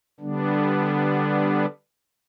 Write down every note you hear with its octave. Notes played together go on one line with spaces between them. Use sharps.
D3 G3 B3 D4